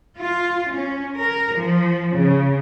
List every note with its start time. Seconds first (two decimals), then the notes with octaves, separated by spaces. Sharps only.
0.15 F4
0.73 C#4
1.16 A#4
1.56 F3
2.15 C#3